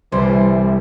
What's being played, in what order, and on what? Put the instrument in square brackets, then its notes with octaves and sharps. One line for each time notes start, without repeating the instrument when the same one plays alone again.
[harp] C2 [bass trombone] E3 [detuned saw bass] G3 [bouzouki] C5